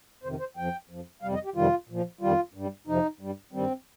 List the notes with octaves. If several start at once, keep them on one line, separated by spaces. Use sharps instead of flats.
F2 C3 D#3 C5
C5
F2 F3 G5
F2 F3
F2 C3 G3 F5
D#5
G4
F2 C3 D#3 G3 F4
A#2 F3
F2 D#3 G3 F4
G2 G3
F2 C3 F3 D#4
G2 G3
G2 D#3 G3 C4